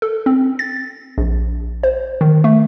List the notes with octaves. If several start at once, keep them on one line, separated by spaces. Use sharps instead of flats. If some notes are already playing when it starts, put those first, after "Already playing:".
A4
C4
A6
A#1
C5
D#3
A3